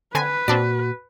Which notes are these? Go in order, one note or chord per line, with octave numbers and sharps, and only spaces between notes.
D3 C4 B4 G#5
A#2 C4 D4 F#4 D5